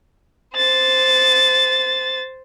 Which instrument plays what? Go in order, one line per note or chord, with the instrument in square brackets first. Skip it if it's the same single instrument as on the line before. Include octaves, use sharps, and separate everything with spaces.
[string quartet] C5 A6